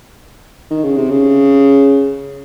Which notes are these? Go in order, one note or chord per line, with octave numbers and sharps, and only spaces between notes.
D#3
C#3
C3
C#3